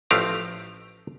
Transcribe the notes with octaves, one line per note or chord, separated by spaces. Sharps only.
A1 F3 A3 G4 F5 A#5